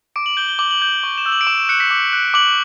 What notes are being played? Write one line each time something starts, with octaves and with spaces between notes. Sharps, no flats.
D6 D7
F#7
G6 G7
G7
D6 F#7
F#7
G6 F#7
G7
C#6
E7
E6 G6
F#7
D7
D6 E7
E7
F#6 C#7
B6
D6
F#6
D6 F#7